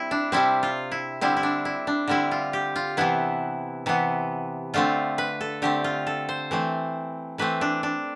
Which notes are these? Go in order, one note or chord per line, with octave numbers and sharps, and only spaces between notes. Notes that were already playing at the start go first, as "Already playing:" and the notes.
Already playing: G3 C4 E4
D4
C3 G3 C4 E4
F4
E4
D3 G3 C4 E4
E4
D4
E4
D4
D3 G3 C4 E4
F4
G4
F4
C3 E3 B3 E4
C3 E3 B3
D3 A3 C4 F4
B4
A4
D3 A3 C4 G4
F4
A4
C5
E3 A3 C4
E3 A3 C4 B4
D4
D4